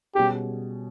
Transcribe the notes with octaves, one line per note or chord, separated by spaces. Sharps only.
B2 G3 C#4 G4 G#4